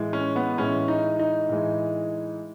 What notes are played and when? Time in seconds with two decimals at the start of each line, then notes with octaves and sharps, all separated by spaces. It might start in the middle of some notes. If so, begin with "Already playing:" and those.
Already playing: A2 E3 G#3
0.13 C#4
0.36 B3
0.58 A2 E3 G#3 C#4
0.88 D#4
1.19 D#4
1.49 A2 E3 G#3